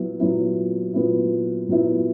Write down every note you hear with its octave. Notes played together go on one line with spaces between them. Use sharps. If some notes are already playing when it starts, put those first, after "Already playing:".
Already playing: A#2 F#3 B3 E4
A#2 F#3 B3 E4
A#2 F#3 B3 E4
A#2 F#3 B3 E4